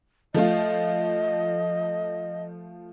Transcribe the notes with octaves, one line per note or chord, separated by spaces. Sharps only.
F3 A3 F4 D#5